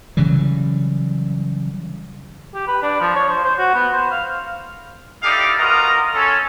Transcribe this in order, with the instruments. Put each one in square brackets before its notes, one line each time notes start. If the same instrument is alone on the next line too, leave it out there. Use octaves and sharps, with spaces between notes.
[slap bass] C#3 E3 F#3 G3
[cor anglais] G4
B4
D4
F3
C#5
C5
C5
F#4
B3
C5
F5
[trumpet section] D#4 E4 G4 A4 D5 F5
B3 F4 F#4 A#4 D#5 A#5
C#4 A4